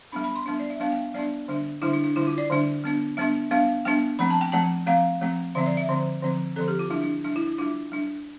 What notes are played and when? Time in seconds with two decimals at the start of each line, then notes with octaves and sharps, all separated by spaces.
0.12 G3 B3 D4 B5
0.24 B5
0.35 C6
0.46 G3 B3 D4
0.59 D5
0.70 E5
0.80 G3 B3 D4 F5
0.92 G5
1.14 G3 B3 D4 D5
1.48 D3 G3 D4
1.82 D3 G3 D4 E4
1.93 D4
2.04 D4
2.16 D3 G3 D4 E4
2.27 F4
2.38 D5
2.50 D3 G3 D4
2.84 G3 B3 D4
3.17 G3 B3 D4 E5
3.51 G3 B3 D4 F5
3.85 G3 B3 D4 G5
4.19 F3 A3 C4 B5
4.30 A5
4.41 G5
4.52 F3 A3 C4 A5
4.87 F3 A3 C4 F5
5.21 F3 A3 C4
5.55 D3 F3 C4 E5
5.66 D5
5.77 E5
5.89 D3 F3 C4 C5
6.23 D3 F3 C4
6.56 D3 F3 C4 A4
6.68 G4
6.79 F4
6.90 G3 D4 E4
7.02 D4
7.24 G3 D4
7.36 E4
7.47 E4
7.58 G3 D4 F4
7.92 G3 D4